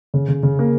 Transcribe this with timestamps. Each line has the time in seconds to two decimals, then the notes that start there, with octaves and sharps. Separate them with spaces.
0.14 C#3
0.28 C#3
0.43 C#3
0.59 A#3